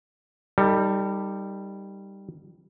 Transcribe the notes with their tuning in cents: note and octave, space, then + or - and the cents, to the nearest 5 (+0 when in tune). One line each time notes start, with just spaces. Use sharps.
G3 +0 D#4 +0 A4 +45